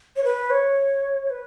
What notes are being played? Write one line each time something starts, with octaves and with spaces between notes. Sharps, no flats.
C#5
B4
C#5
B4